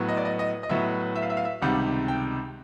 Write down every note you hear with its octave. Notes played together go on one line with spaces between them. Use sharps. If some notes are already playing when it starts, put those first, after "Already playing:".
Already playing: A2 F#3 B3
D#5
D5
D#5
D#5
D#5
A2 F#3 B3 E5
E5
F5
E5
F5
E5
C#2 C3 D#3 G3 F#5
G5